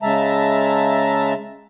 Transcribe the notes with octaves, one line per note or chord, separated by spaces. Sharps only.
C#3 G#3 E5 A5 A#5